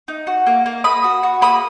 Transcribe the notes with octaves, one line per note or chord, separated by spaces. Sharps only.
D#4
F#4
A#3
A#3
A#3 B5 D#6
F#4
F#4
A#3 B5 D#6